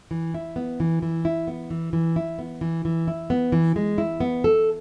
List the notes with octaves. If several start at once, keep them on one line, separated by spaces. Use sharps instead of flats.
E3
E4
B3
E3
E3
E4
B3
E3
E3
E4
B3
E3
E3
E4
B3
E3
G#3
E4
B3
A4